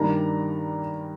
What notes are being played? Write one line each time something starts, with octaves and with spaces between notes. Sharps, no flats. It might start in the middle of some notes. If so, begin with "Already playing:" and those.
Already playing: G2 D#3 G3 A#3 D4 A#5